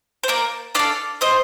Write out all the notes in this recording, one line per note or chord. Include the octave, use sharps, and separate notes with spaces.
C5
A#3 A#4 D5
D4 A4 D5 F5
C4 C5 D#5